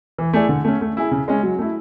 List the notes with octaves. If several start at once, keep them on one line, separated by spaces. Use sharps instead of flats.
E3
A3 E4 G#4 D5
D3
A3 C#4
A3
E4 G#4
C#3
G#3 C#4
F#3
A3 E4